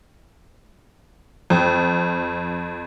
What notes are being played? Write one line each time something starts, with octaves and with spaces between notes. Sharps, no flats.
F2